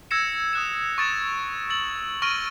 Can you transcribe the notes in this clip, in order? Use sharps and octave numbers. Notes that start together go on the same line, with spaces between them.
E6 G#6 A#6 C#7 E7
D#6 F#6 E7
C#6 D#6 A6 D7 E7
E6 A6 F#7
C#6 F6 A#6 D7 D#7 G7